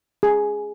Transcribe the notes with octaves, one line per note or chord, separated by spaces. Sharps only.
G#4